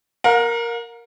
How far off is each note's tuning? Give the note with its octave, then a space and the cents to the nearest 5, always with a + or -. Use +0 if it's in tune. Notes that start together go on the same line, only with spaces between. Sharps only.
A#4 +0 F5 +45